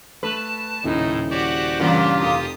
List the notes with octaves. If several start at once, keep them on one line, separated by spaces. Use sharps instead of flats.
A3 B4 A5
D#1 A2 C#3 D#4 E4
F#4 G4 C5 D5 F#5
G2 A#2 C#3 E3 A#3 F4 G4
F1 D#6